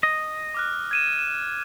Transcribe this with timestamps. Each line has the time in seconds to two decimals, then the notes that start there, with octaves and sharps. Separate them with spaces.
0.03 D#5
0.54 D6 F6 F#6
0.91 G#6 D#7 E7
1.19 E7